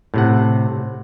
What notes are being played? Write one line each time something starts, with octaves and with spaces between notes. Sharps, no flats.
A2 C3 F#5